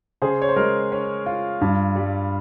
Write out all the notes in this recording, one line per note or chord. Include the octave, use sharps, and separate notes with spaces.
C#3 G#4 C5
C#5
C5
G#3 A#4
C#4
F4
G2
G3